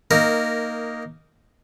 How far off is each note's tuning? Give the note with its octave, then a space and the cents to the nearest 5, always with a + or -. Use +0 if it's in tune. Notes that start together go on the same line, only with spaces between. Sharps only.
A#3 +0 D#4 +0 A#4 -15